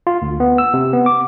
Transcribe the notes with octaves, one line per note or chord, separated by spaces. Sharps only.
F4
D2
B3
E6
C3
B3
D6